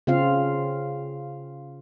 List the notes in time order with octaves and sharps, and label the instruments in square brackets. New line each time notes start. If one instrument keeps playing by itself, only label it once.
[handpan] C#3 C4 F4 F5